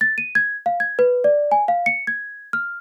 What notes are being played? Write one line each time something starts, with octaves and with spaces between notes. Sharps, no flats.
A6
D#7
G#6
F5
G#6
B4
D5
G#5
F5
C#7
G#6
F6